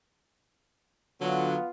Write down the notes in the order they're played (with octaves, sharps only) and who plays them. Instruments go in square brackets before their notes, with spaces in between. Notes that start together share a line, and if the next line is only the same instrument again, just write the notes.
[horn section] D3 F#3 [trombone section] B3 F4